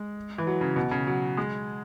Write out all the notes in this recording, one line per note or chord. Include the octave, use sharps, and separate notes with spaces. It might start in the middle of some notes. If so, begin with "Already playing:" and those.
Already playing: G#3
E3
F#3
C#3
B2
C#3
F#3
G#3